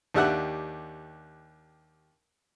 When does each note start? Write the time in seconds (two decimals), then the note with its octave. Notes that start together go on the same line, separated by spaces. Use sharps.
0.14 D#2 D4 G4 E5 F#5 F#6